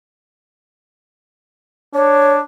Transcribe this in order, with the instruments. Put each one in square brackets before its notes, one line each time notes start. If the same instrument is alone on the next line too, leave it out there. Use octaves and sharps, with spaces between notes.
[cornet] D4 [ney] C#5